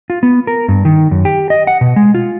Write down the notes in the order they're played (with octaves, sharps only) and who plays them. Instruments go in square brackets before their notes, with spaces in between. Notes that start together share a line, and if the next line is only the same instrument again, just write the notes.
[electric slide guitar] F4
B3
A#4
G2
D#3
F#2
G4
D#5
F#5
B2
G#3
F4